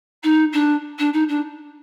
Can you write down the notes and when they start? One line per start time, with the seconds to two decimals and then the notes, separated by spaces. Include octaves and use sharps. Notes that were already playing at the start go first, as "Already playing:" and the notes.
0.23 D#4
0.52 D4
0.98 D4
1.13 D#4
1.28 D4